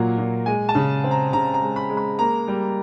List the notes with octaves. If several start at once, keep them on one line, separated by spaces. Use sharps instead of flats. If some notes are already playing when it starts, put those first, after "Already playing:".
Already playing: A#2 F#3 A#3
A#2
G#3 G#5
A5
C#3
C4
A#5
C#3 A#5
A#5
G#3
B5
G#3
B5
A#3 A#5
G3